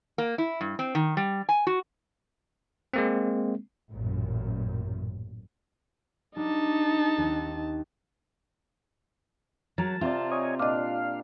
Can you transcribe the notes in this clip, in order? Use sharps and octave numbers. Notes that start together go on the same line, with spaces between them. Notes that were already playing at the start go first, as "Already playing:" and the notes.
A#3
E4
G2
C4
D#3
G3
G#5
F#4
G#3 A#3 C4
A1 F#2 A#2
G3 D4 D#4 A5
D#2 C4 F#6
F#3 A#4 A5
C3 F4 D5
C#5 D#5 G#5
A#2 D4 D#5 F5 D6